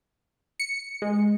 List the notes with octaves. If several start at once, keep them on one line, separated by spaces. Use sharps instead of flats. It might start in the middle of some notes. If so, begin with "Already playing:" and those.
C#7
G#3